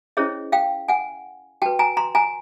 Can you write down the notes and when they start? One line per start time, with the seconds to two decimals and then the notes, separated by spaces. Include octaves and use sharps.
0.17 C#4 E4 G#4 C5 C#5 D#5
0.52 F5 G5
0.88 F#5 G#5
1.62 F#4 B4 G5 A5
1.79 G#5 A#5
1.97 A#5 C6
2.15 G#5 A#5